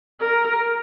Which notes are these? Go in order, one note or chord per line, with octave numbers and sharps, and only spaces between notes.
A#4